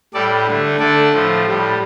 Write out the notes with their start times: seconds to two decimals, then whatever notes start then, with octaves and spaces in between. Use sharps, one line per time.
0.14 A2 G3 A4 D5
0.47 D3 A3
0.79 D3 A3 A4 D5
1.12 A2 F3 A3
1.45 A2 G3